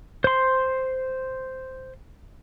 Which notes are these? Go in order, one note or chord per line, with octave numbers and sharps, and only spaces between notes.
C5 C6